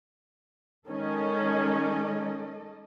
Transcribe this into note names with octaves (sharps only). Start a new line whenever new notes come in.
D#3 G#3 C#4 A4 D#5